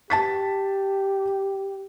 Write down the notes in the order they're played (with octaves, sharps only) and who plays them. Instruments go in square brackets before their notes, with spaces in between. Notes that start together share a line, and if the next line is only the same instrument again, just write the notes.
[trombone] G4 [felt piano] A5 A6 B6